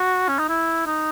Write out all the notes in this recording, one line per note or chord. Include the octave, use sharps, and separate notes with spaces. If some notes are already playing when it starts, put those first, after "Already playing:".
Already playing: F#4
C#4
D#4
E4
D#4